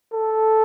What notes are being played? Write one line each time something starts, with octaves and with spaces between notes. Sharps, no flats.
A4